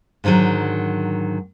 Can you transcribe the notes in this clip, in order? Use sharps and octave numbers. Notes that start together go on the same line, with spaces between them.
G#2 D3 D#3 F3 F#3